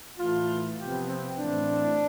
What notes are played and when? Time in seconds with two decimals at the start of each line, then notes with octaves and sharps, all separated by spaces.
0.18 A2 E3 A3 F4
0.77 C3 F3 B3 G4
1.08 C4
1.37 A2 E3 A3 C4 D4